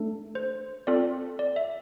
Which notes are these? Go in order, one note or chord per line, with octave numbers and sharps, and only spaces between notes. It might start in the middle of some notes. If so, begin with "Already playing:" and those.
Already playing: A3 D4 A4
C5
C4 F4 A4 D5
D5
E5